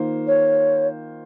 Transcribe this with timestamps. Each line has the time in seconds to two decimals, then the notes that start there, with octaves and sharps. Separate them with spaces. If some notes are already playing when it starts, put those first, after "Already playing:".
Already playing: D#3 A#3 F4 C5
0.27 C#5